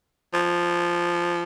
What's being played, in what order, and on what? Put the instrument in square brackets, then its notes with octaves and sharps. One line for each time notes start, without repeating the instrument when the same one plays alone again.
[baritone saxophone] F3